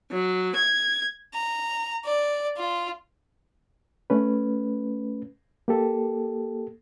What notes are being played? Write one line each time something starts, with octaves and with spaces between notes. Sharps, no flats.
F#3
G#6
A#5
D5
F4
A3 C#4 B4
A#3 G4 A4